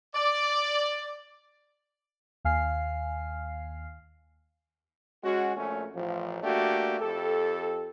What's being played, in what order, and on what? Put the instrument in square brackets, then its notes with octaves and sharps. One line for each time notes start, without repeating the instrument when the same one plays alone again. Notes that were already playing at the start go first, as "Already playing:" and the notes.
[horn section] D5
[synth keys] D#2 F5 G#5 F6 C7
[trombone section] G#3 C#4 F#4
A#1 A3 C#4
A1 F3
A3 A#3 D4 F#4 G4
F2 G4 A4